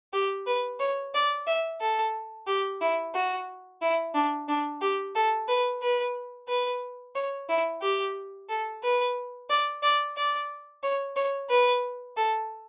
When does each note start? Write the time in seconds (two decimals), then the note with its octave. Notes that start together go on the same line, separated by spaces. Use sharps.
0.13 G4
0.46 B4
0.80 C#5
1.14 D5
1.47 E5
1.81 A4
2.47 G4
2.81 E4
3.15 F#4
3.82 E4
4.15 D4
4.48 D4
4.81 G4
5.15 A4
5.48 B4
5.82 B4
6.48 B4
7.15 C#5
7.49 E4
7.82 G4
8.49 A4
8.83 B4
9.50 D5
9.83 D5
10.17 D5
10.83 C#5
11.16 C#5
11.50 B4
12.17 A4